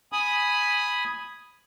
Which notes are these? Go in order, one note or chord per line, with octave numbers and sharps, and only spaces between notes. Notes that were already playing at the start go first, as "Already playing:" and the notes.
G#5 B5 D#6